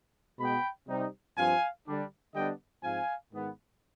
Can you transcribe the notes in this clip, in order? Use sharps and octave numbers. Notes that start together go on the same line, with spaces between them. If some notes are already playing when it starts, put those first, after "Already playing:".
B2 G#3 B3 G5 B5
C3 G3 C4 D#4
G2 F3 C4 F5 G#5
D3 G3 D4
D3 G3 B3 D4 D#5 G5
G#2 F3 C4 F5 G#5
G#2 D#3 G#3 B3